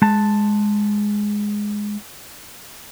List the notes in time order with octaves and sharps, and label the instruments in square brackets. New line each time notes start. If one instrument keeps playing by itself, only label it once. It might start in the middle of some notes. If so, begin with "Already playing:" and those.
[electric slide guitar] G#3 A5